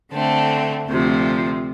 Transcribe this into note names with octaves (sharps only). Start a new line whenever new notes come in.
D3 A3 C4
D2 C3 F3